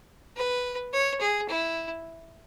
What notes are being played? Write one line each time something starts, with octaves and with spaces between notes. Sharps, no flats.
B4
C#5
G#4
E4